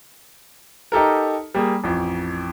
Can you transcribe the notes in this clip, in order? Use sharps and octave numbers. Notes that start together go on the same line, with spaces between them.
D#4 G4 A4 A#4
G3 A#3 G#4
A1 F2